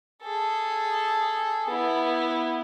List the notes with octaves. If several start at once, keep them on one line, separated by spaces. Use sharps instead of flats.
G#4 A4
B3 E4